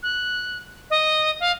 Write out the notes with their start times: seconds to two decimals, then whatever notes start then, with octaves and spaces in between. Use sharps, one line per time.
0.03 F#6
0.90 D#5
1.40 F5